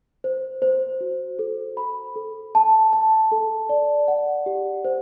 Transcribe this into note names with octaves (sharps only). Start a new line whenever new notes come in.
C5
C5
F#4
A4
B5
A4
A5
A5
A4
D5
F#5
G4
C5